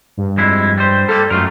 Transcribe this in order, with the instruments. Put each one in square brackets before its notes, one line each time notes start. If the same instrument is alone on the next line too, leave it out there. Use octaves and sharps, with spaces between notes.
[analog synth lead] G2
[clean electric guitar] F2 G#3 E4
G3 C5
[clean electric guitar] G3 A#3 [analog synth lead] A4
[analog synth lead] F#2 [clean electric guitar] A3 F4 A#4